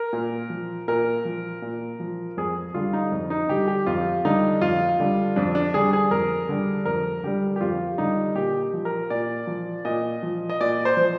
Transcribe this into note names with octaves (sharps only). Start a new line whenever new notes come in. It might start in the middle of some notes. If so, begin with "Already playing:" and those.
Already playing: A#4
A#2
F3
A#2 A#4
F3
A#2
F3
F2 G#4
D3 G3 F4
D#4
F2
D#4
D3 G3 G4
G4
F2 F4
D3 G3 D#4
F2 F4
D3 G3
F2 D4
D4
D3 G3 G#4
G#4
F2 A#4
D3 G3
F2 A#4
D3 G3 G4
G4
F2 F4
D3 G3 D#4
A#2 G4
F3
A#4
A#2 D5
F3
A#2 D#5
F3
D#5
A#2 D5
C5
F3